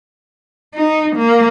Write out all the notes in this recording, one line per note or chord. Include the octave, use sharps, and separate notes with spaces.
D#4
A#3